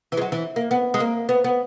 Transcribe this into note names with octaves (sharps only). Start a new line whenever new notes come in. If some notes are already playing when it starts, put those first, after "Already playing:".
E3
G#3
F#3
E3
A#3
B3
G#3
A#3
B3
B3